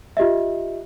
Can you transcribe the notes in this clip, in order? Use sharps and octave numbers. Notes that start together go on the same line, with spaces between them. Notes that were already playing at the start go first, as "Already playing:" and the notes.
F4 G4 D#5 E5